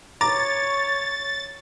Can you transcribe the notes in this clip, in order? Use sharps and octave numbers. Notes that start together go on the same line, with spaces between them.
C#5 A#5 D6 A6